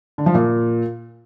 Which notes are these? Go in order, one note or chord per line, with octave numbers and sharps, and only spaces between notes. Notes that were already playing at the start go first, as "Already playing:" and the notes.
D3
F3
A#2